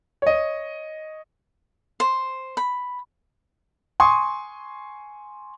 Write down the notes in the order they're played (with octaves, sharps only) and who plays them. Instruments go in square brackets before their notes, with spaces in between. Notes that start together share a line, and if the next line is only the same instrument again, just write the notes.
[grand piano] C#5 D#5
[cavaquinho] C5
B5
[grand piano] G#5 C6 C#6 D#6